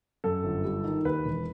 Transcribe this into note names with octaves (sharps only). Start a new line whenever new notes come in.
F#2 A4
G1
G3
D#3
D#2 B4
E1